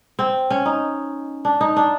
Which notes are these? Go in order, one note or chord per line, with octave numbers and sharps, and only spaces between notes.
C4
C#4
D#4
D4
D#4
D4